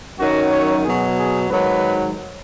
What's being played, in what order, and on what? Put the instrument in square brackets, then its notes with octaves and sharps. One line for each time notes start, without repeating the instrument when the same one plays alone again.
[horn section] F#2 D#3 F#3 F#4
C#5
B2 F#3 G#4
G#4
G#2 D#3 F#3 B4